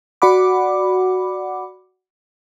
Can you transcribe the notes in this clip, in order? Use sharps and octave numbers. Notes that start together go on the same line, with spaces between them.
F#4 D5 F#5 B5 D6